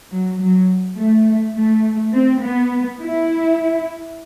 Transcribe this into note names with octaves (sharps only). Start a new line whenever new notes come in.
F#3
F#3
A3
A3
C4
B3
E4